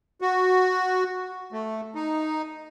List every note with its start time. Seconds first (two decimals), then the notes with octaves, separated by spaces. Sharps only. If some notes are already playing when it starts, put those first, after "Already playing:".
0.21 F#4
1.52 A3
1.95 D#4